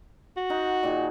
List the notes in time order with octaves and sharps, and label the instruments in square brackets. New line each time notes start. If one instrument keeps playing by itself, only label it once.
[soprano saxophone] F#4
[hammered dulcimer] D#4 F#5
A#2 D#3 G#4